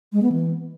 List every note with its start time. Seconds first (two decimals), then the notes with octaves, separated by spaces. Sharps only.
0.13 G#3
0.23 B3
0.32 E3